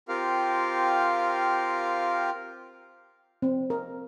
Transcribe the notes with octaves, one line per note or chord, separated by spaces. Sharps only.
C4 F4 G4 A#4 F5
C4
A#4